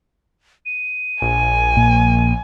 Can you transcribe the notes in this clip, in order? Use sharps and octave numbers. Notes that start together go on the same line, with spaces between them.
D#7
A#1 G#5
A#2